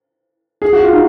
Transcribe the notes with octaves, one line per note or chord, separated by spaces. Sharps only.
G#4
F#4
F4
D#4 F#4